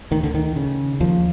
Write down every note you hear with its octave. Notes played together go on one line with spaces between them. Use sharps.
D2 D#3
D3
D#3
C#3
D#2 F3